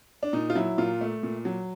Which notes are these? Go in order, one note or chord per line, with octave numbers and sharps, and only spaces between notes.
D4
A#2 D#4
F4
F#3 E4
A#2 F4
A3
A#2
F#3